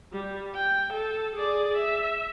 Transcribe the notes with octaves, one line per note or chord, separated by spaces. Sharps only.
G3
G5
A4
G#4 D5
E5